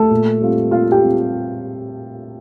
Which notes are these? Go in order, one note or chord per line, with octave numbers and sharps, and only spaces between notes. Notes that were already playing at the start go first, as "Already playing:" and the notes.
Already playing: A3 A4
A#2
G3 C4 F4
A#2 F4 F5
G4 G5
G3 C4 F4